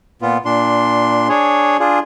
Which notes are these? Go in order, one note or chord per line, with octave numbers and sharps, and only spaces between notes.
A#2 B3 F4
A#2 D4 C6
D4 G#4 C#5
D4 F4 G#4